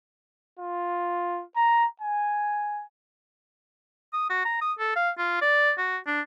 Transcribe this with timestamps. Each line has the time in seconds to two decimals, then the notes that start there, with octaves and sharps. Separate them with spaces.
0.59 F4
1.56 A#5
2.01 G#5
4.13 D#6
4.30 F#4
4.45 A#5
4.61 D#6
4.79 A4
4.96 F5
5.18 F4
5.42 D5
5.78 F#4
6.07 D4